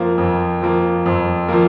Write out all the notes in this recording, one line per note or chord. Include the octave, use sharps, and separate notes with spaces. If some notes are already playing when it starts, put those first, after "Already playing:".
Already playing: F2 F3 A#3
F2
F3 A#3
F2
F3 A#3